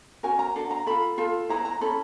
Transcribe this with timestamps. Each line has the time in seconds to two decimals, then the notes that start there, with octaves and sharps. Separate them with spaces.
0.23 C#4 F#4 A#4 G#5
0.39 A#5
0.56 D4 F#4 A4
0.71 A#5
0.87 F4 A4 B5
1.18 F4 A4
1.49 E4 G#4 B4 A#5
1.65 A#5
1.80 C#4 E4 A4 B5